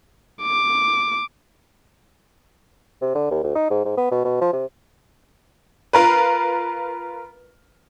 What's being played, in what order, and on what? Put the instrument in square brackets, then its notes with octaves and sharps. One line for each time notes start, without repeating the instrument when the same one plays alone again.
[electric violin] D6
[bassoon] C3
D3
D#2
D2
D#4
G#2
G#2
B3
B2
B2
F3
C3
[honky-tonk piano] F4 A#4 B4